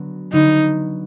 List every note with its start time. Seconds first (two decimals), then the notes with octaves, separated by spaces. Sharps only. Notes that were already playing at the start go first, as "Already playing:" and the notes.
Already playing: D3 F#3 B3
0.33 D3 F#3 B3 D#4